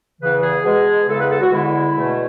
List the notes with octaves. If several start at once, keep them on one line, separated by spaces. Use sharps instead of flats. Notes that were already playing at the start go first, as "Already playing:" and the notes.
E2 C#3 E3 B4
G#4
B2 G#3 G#4
E2 C#3 G#3 A4
B4
A4
F#4
E2 D3 G#3 E4
E2 B2 A3